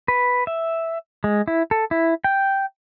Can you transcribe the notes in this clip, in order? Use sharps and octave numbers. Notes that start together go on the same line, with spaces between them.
B4
E5
G#3
E4
A4
E4
G5